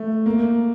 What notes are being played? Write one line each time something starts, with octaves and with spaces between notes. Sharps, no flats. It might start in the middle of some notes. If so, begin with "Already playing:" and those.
Already playing: A3
A#3